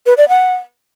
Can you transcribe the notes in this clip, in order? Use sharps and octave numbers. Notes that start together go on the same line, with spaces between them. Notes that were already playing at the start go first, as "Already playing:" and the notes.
B4
D5
F#5